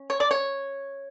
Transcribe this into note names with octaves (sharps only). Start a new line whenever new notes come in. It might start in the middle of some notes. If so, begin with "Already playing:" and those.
Already playing: C#4
C#5
D5
C#5